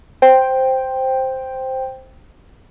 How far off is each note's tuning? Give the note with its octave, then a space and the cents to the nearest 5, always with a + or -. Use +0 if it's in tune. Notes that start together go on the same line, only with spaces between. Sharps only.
C5 +0 G5 +0